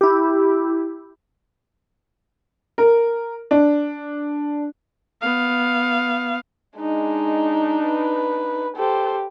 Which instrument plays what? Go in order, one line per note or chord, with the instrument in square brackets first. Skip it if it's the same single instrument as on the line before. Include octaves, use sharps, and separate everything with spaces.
[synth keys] E4 G4
[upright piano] A#4
D4
[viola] B3 F5
[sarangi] G#3 [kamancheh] D4 D#4
[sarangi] B4
[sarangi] G4 [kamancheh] A4 C5